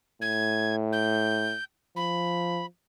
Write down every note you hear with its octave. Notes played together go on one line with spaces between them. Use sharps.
A2 G#6
G6
F3 B5